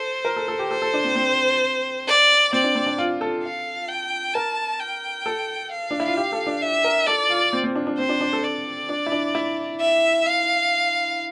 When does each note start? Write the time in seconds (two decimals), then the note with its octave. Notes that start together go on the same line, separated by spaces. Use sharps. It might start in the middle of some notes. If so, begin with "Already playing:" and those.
Already playing: A4 C5
0.25 A#4
0.37 A4
0.48 A4
0.59 G4
0.70 A4 C5
0.82 A4
0.94 D4
1.04 C4
1.16 C4
2.08 D5
2.53 C4 D5
2.64 D4
2.76 C4
2.86 D4
2.98 F4
3.21 A4
3.44 F5
3.89 G5
4.34 A#4 A5
4.80 G5
5.26 A4
5.71 F5
5.91 D4
6.00 E4
6.08 F4
6.17 G4
6.32 A4
6.47 D4
6.62 E5
6.84 A#4
7.07 A4 D5
7.30 F4
7.53 C4
7.64 C4
7.76 D4
7.87 D4
7.98 C4 C5
8.09 D4
8.21 D4
8.33 A4
8.44 D5
8.89 D4
9.06 E4
9.12 D4
9.35 E4
9.80 E5
10.26 F5